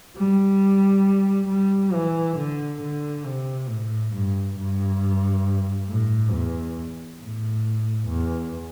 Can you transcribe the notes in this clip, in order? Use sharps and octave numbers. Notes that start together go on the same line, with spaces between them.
G3
G3
E3
D3
D3
C3
A2
G2
G2
A2
E2
A2
E2